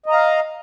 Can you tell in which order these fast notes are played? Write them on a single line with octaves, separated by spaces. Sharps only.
D#5 A#5 F5